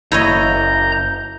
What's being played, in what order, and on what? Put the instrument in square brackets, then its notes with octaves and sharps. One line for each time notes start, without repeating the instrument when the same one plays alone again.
[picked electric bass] F#1 [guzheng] E4 C#5 D#5 [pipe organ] A#5 G6